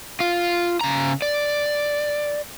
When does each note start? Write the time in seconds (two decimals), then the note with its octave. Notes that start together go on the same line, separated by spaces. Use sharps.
0.20 F4
0.81 C#3 A#5
1.22 D5